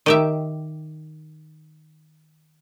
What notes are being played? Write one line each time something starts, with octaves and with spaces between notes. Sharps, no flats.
D#3 G4 E5